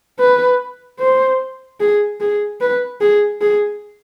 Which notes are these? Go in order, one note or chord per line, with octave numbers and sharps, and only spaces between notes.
B4
C5
G#4
G#4
B4
G#4
G#4